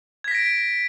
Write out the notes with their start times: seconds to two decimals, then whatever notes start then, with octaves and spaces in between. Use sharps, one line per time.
0.24 G#6
0.28 B6
0.31 A#6
0.35 D7